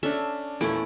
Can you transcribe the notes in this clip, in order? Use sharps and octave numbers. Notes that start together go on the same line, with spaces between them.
C#4 D4 A4 E5
E2 A#2 A3 C#4 E4 D7